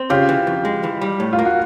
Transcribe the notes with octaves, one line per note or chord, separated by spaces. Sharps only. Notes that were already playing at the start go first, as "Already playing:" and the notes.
Already playing: C4
C#3 F4 G4
E3
F2
G#3
E3
G3
A2
F4
A#3
F#4